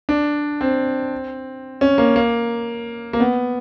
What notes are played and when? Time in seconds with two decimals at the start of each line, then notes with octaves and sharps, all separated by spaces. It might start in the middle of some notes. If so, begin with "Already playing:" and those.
0.09 D4
0.61 C4
1.81 C#4
1.98 A#3
2.16 A#3
3.13 A#3
3.20 B3